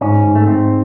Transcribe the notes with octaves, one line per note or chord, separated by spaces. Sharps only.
G#2 C#4
G#2
A3
G#2 C4